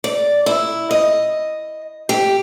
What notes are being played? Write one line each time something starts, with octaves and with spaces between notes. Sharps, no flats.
D5
E4
D#5
G4